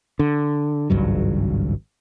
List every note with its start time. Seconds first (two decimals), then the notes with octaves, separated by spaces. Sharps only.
0.19 D3
0.90 G#1 C#2 G2 F#3